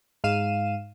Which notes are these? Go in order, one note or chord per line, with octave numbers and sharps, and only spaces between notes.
G#2 F5 D#7 E7